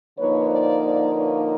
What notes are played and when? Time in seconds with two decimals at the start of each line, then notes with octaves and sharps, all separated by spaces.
0.18 D3 F3 A#3 D#4 B4 C#5
0.50 C5 D5
0.81 C5 D5
1.13 B4 C#5